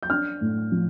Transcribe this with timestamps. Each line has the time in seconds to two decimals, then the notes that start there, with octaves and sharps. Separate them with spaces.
0.03 G6
0.10 D4 F6
0.41 A2
0.72 F3